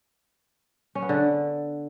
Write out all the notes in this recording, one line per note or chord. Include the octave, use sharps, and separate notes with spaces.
C#4
B3
D3